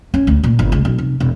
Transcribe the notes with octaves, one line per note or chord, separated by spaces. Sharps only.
C#4
D2
A#2
G1
C#2
B1
F1
E1